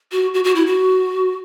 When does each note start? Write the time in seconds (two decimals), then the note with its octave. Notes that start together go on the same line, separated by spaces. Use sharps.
0.12 F#4
0.34 F#4
0.44 F#4
0.55 E4
0.66 F#4